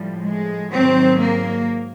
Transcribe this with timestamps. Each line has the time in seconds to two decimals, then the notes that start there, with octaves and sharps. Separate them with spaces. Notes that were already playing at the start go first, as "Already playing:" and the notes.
Already playing: A2 F3 G3
0.24 G#3
0.73 G#2 D#3 F#3 C4
1.21 A#3